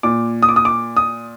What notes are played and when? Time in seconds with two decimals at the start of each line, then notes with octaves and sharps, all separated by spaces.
0.03 A#2 D6
0.43 D#6
0.49 D6
0.56 D#6
0.65 D6
0.97 D#6